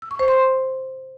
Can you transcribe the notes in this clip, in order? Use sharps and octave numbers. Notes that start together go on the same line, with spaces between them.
E6
C#6
C5
C6